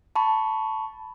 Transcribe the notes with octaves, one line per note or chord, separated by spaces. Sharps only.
A5 B5 C#6